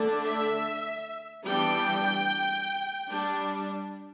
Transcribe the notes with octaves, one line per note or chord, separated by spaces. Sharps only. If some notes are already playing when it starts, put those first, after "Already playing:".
Already playing: D3 A3 D4
E5
E3 G3 B3 D4 G5
G3 D4